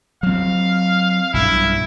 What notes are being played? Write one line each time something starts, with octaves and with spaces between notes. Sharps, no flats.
F#3 C4 F5
B1 G2 E4